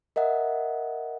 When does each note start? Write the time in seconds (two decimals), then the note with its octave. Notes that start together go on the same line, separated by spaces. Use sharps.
0.16 A#4 D#5 E5 F#5